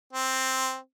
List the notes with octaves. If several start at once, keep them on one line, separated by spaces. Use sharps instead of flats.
C4